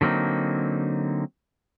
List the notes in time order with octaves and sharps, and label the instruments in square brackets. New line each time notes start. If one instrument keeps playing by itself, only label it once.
[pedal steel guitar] D3 F#3 A#3 C4 D#4